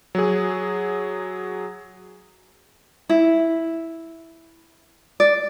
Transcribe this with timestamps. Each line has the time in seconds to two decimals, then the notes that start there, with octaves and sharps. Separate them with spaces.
0.15 F#3 G#4
3.09 E4
5.20 D5